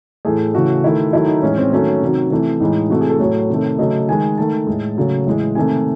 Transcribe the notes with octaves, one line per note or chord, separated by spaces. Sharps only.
A2 E3 A3 G#4
C#3 E3 A3 F#4
D#3 A3 E4
D#3 F#3 A3 E4
D#4
A2 E3 G#3 C#4
C4
D#3 F#3 A3 C#4
C3 D#3 F#3
C3 E3 A3
A2 E3 G#3 D#4
C3 E3 A3 F#4
G#4
A4
A2 F#3 A3 C#5
C3 D#3 A3
C#3 F#3 A3 D#5
D#3 G#3 G#5
D#3 A3 A5
A2 G#3
C#3 F#3 A3
A2 E3 G#3
C3 D#3 A3 G#5